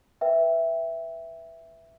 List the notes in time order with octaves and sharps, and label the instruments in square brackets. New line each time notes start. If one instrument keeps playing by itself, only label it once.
[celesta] B4 E5 G5